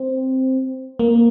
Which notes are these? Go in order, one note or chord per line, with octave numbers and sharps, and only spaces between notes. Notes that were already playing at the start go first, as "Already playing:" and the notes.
Already playing: C4
A#3